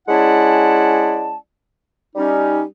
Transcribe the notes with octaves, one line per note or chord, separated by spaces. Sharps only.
G#3 C#4 E4 D5 F#5 A5
G3 C#4 D#4